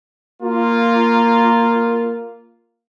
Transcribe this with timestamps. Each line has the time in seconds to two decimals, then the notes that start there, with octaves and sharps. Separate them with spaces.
0.43 A#3 F4